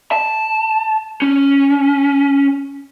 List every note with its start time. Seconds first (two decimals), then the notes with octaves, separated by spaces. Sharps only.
0.12 A5
1.22 C#4